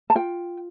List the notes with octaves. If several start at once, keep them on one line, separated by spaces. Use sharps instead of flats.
A5
F4 G5